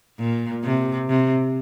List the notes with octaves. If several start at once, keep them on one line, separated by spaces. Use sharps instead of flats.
A#2
C3
C3